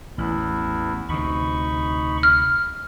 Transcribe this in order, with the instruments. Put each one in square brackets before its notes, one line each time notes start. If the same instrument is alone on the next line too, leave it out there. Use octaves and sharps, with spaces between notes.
[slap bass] A1 [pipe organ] E2 E4
[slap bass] D2 C3 [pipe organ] D#4 B5 C#6
[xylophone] F6